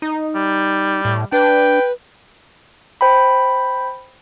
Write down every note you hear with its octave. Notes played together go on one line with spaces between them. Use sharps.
D#4
G3
A2
D4 B4 G5
C5 G5 B5